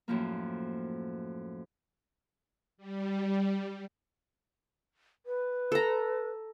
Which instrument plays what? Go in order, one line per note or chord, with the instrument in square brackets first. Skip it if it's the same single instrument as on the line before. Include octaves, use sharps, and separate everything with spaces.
[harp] F#2 A2 F3 A#3
[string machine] G3
[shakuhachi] B4
[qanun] A4 A#5